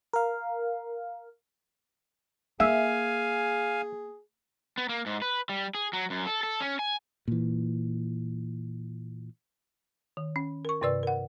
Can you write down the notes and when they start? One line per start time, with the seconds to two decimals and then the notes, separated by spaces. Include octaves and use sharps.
0.13 A#4 F5
2.60 A#3 G#4 E5 F5 G#5
4.78 B3
4.89 A#3
5.06 G#2
5.22 B4
5.49 G3
5.75 G#4
5.93 F#3
6.10 F#2
6.27 A4
6.43 A4
6.60 C#4
6.79 G#5
7.28 A#2 E3
10.17 D#3
10.36 C#4
10.65 A#4 C#6
10.81 G2 C3 B4 D5 E6
11.03 A#4 F#5